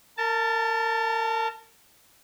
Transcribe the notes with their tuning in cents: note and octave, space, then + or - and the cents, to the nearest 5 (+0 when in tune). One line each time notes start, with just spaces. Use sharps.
A#4 -30 A5 +5